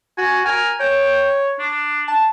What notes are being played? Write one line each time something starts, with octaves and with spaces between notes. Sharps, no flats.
F#4 G#5
A#4 G#5
C#5 G5
D4
A5